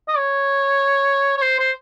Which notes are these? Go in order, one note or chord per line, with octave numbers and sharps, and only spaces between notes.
D#5
C#5
C#5
C5
C5